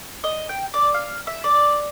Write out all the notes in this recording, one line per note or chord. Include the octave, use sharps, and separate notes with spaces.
D#5
G5
D5
F5
E5
D5